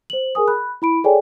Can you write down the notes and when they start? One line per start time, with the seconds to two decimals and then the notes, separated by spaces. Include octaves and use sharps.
0.10 C5 F#7
0.35 G#4 A#4 G#5 D#6
0.47 B5 F#6
0.82 E4 B5 D7
1.04 G#4 A4 C#5 D5 G5 G#5